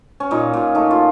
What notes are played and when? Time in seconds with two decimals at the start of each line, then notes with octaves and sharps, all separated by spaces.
0.20 C#4
0.31 A#2 D#4
0.53 A#2
0.75 A3 D#4
0.91 F4